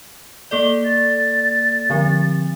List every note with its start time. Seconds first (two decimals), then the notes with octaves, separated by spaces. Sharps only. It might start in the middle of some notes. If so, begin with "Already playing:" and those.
0.51 A#3 A4 D5 G7
0.85 A6
1.90 D3 F3 C4